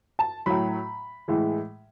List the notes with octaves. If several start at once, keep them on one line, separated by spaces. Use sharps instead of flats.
A5
A2 F#3 B5
A2 E3 G#3